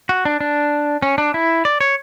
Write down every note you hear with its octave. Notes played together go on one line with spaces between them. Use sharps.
F#4
D4
D4
C#4
D4
E4
D5
C#5